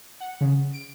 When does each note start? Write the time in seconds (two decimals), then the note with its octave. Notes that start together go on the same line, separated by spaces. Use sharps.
0.20 F#5
0.41 C#3
0.73 D7